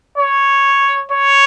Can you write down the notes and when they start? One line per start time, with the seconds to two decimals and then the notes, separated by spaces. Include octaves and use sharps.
0.18 C#5
1.12 C#5